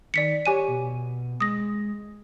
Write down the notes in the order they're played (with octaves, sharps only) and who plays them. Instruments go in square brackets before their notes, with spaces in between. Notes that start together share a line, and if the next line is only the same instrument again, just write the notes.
[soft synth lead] D#3 [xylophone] D5 B6 C#7
[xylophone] G4 G#5 D#7 [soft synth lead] C#5
[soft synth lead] B2
[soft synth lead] G#3 [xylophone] D#6 A#6